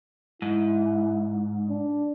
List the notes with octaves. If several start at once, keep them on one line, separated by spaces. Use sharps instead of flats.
G#2 E4
D4